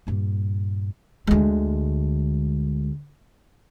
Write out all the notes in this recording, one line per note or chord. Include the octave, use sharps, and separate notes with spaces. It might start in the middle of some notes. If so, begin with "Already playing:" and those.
G2 A#2
D2 G#3